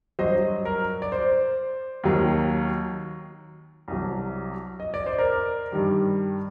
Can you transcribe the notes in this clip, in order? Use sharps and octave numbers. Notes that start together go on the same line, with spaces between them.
G2 F#3 C5 D#5
A#4
D5
C5
D#2 D#3 F#3
C2 C3 F#3
D#5
D5
C5
A#4 D5
G2 D#3 G3